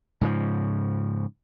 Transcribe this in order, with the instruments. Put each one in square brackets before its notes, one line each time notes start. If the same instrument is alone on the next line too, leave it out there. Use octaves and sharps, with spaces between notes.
[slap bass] G#2 C#3 F3